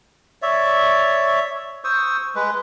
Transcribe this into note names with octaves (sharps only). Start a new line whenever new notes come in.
C#5 D5 E5
C5 C#6 D#6 E6
G#3 B4